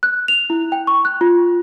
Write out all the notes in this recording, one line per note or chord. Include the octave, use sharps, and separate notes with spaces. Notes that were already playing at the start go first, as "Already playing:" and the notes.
F#6
F7
E4
G5
C#6
F#6
F4